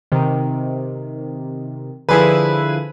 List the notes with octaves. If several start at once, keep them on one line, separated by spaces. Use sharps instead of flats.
C3 D#3
D3 F3 E4 G#4 B4